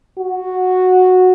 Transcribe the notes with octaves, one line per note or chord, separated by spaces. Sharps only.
F#4